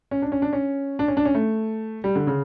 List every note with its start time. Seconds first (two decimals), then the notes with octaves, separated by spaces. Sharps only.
0.11 C#4
0.22 D4
0.32 C#4
0.42 D4
0.53 C#4
0.99 D4
1.08 C#4
1.17 D4
1.25 C#4
1.35 A3
2.04 G3
2.16 D3
2.27 C#3